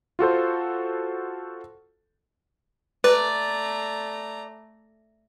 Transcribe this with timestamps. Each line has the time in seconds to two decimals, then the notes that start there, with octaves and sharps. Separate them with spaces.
0.19 F4 F#4 A4 C5
3.04 A3 B4 D5 A#5